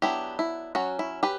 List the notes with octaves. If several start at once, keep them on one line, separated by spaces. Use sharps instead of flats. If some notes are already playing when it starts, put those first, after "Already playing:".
F#3 B3 D4 E4 G4
E4
F#3 C#4 F#4
E4
G4 B4